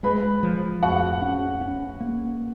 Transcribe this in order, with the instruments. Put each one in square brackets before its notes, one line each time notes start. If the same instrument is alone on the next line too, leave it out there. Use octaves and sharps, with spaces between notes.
[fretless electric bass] G#3 [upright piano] B4 B5
[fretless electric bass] F3
[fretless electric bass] F2 [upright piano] F#4 F#5
[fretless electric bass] C#4
C#4
A#3